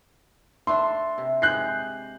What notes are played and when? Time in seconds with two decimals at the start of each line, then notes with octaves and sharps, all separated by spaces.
0.67 A3 D4 A4 C6
1.18 C3
1.42 G#3 G4 G#4 F#6 G6 C7